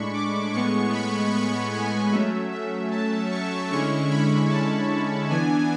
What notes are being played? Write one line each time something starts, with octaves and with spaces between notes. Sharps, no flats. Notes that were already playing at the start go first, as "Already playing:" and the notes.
Already playing: A2 G#3 D4 B5 C#6
D6
A2 G#3 B3 C#6
B5
C#6
G#5
F#3 A3 C#4 E5
E5
A5
C#6
D3 G#3 C#4 E4 C#6
B5
A5
E3 B3 D4 G#5